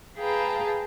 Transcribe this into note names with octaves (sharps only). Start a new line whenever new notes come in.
G#4 B4 F5 G5 A5 A#5